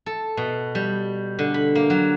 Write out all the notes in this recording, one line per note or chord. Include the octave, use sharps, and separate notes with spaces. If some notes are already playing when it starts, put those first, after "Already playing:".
A4
B2
G3
D3
B5
A#3
F#3